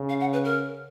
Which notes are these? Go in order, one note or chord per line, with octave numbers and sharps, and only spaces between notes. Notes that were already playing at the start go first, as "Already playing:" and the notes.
Already playing: C#3
F5
F#5
B4
A#4